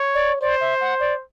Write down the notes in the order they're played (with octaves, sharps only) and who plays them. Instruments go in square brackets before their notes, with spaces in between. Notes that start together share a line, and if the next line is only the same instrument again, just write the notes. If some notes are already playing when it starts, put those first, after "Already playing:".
Already playing: [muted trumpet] C#5
[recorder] D5
[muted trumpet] C5 [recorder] D5
[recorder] E5
F#5
D5